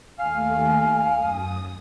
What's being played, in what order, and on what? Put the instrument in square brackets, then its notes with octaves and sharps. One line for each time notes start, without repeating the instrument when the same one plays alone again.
[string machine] D#2 A3 [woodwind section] F5 [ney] G#5
[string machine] F#2 D#6